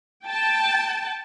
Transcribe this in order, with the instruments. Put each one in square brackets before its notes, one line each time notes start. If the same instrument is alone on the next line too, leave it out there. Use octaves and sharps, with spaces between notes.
[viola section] G5 A5